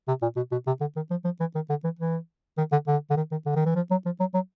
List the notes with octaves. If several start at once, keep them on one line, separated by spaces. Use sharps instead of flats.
C3
A#2
B2
B2
C3
D3
D#3
F3
F3
E3
D#3
D3
E3
E3
D#3
D3
D3
D3
D#3
D#3
D3
D#3
E3
F3
F#3
F3
F#3
F#3